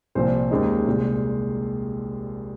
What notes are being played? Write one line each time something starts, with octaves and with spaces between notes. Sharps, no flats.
C2 A#2 F3 C4 C5
D#2 C#3 G#3 D#4
C2 A#2 G#3